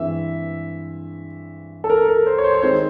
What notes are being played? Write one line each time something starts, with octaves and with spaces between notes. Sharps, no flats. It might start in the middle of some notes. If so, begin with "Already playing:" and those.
Already playing: G2 E3 G#3 C4 E5
A4
A#4
A#4
C5
C#5
C5
C#5
D#3 G#3 C4 D#4 C5